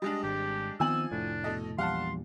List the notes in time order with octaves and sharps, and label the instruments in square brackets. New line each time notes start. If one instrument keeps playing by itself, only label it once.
[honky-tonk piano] G3 G#3 D4 [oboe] D#5
[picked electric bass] G#1 [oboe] G4
[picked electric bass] D#3 B3 C4 [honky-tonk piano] F3 G#5 F#7 [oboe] E6
[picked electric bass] F1 A2 [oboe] D4
[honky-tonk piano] B2 A4 D#5
[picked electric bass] A#1 E2 G3 [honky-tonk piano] F5 F#5 A5 [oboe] C6